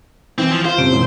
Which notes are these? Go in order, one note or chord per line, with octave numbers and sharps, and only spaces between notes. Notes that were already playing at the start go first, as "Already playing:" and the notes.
E3 C4
F3
F4 C5
F#1 C3 D7
E1 G#2